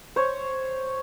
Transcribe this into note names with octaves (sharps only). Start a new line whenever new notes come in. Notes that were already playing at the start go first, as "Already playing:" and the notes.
C5 C#5